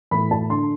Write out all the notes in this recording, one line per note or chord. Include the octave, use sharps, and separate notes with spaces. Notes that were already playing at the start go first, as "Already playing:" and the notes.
A2 E3 B5
A5
D3 C6